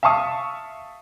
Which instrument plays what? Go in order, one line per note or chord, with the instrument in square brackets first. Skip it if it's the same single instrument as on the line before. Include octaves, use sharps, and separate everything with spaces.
[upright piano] E5 F5 A5 C#6 D#6